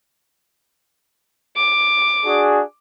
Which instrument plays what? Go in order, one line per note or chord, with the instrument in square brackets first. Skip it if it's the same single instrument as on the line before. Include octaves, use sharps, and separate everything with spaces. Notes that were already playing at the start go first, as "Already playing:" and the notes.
[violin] D6
[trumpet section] D4 F#4 G#4